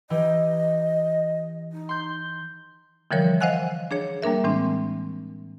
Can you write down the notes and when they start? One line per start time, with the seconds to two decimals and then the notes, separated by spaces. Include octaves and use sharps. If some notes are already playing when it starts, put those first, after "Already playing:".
0.10 E3 G4 D#5
1.72 D#4
1.89 C6 G6
3.11 D3 E3 F3 G3 A#4 C#5
3.40 C5 D#5 F5 F#5 G#5 F#6
3.91 D4 G#4 C#5
4.22 G3 A#3 D4 A#4 E5
4.44 A2 E3 G#3 C4 D4